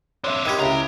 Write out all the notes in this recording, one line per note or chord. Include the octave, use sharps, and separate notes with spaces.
C4 D4 C#5 E5
D#3 G4 B5 D#6 G#6
C#2 A2 B4 A#5